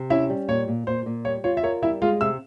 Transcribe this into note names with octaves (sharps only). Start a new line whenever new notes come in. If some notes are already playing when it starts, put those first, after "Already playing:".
Already playing: C3
C#4 E4 E5
G3
A#2 C#5
A#2
A#2 C5
A#2
G3 C#5
F4 C#5
E5
A#4 C#5
G3 E4 E5
G#3 F4 F5
C3 E5 E6